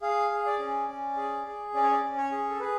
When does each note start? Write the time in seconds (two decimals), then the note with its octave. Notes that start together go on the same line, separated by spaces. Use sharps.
0.02 G#4 F5
0.31 G#4
0.46 D5
0.59 C#4
0.88 C#4
1.17 G#4
1.46 G#4
1.74 C#4 D5
1.83 C#5
1.91 D5
2.03 C#4
2.17 C#5
2.32 G#4
2.49 A4
2.60 G#4 B4